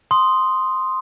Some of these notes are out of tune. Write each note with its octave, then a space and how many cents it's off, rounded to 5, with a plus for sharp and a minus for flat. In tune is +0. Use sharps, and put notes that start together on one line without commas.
C6 +0 D#6 +0